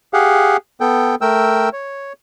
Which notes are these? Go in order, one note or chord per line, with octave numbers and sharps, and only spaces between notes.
G4 G#4 F5 F#5
B3 A4 G5
A3 A#4 G5 E6
C#5